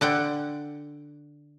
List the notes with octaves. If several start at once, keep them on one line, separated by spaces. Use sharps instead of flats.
D3 F#5 G5